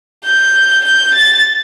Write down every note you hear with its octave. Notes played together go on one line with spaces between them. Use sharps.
G6
G6
A6